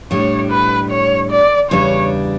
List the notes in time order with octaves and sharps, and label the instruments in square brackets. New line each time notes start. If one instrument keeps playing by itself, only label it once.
[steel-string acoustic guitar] A2 G3 D4 [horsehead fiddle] C#5
[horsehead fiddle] B4
C#5
D5
[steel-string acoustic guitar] E2 C#3 G3 D4 [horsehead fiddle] C#5